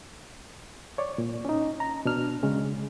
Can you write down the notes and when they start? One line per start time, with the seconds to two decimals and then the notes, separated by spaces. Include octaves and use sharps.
0.98 C#5 D5
1.18 A#2
1.45 C#4 D#4
1.80 A#5
2.05 B2 D4 F6
2.43 C#3 G#3 C#4